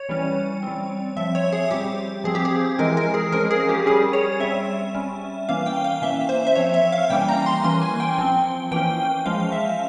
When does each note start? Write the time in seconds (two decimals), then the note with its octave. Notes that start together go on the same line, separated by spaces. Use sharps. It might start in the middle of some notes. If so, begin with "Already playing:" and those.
Already playing: C#5
0.09 E3 G3 C#4
0.63 G3 C4
1.16 F3 C4 E5
1.35 C#5
1.52 G#4
1.71 G3 C4 G4
2.24 F3 C4 G#4
2.35 G4
2.45 G#4
2.78 E3 G#3 C4 A#4
2.97 A#4
3.14 G#4
3.32 F3 G#3 C#4 A#4
3.51 G#4
3.69 G4
3.86 G3 C#4 G#4
4.13 C#5
4.40 G3 C4 E5
4.95 G3 C#4
5.49 E3 A#3 C#4 F5
5.66 G5
5.84 F5
6.02 E3 A#3 C#4 E5
6.29 C5
6.47 E5
6.55 F3 C4 C#5
6.74 E5
6.92 F5
7.10 E3 G3 A#3 C#4 G5
7.29 A#5
7.46 C6
7.64 E3 A#3 C#4 C6
7.82 G#5
8.00 G5
8.18 F3 C4
8.71 E3 A#3 C#4 G5
9.26 F3 G#3 C#4 F5
9.52 E5